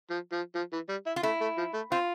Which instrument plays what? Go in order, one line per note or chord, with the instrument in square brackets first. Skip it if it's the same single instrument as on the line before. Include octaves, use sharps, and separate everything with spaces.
[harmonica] F3
F3
F3
E3
G3
E4
[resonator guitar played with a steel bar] F4
[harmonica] A3 [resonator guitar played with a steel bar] E4
[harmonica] A3
F3
A3
[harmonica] C4 [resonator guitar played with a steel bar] F4